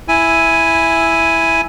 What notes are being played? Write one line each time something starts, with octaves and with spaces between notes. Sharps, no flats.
E4 G#5